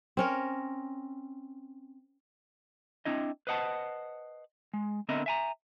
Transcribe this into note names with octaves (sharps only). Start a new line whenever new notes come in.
C4 C#4 A#4
C4 D4 E4 D#5
B4 C5 D#5 F#5 A5
G#3
D3 B3 C4 A#4 D#5 E5
E5 G#5 A#5